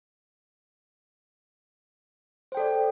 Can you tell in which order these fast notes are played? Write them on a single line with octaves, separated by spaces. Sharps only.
C5 G5 A4 D5